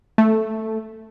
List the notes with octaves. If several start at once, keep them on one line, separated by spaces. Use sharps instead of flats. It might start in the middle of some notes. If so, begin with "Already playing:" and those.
A3